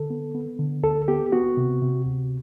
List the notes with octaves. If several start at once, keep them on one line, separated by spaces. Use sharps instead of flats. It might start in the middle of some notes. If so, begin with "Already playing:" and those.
Already playing: D3 A4
B3
B3
D3
D2 A4
B3 G4
B3 F#4
C3
C3
D2